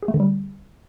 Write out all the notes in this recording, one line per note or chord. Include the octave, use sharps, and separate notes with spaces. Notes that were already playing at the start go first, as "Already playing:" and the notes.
G#4
A3
D3
G3